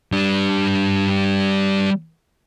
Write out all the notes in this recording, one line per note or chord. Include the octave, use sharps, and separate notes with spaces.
G3 D4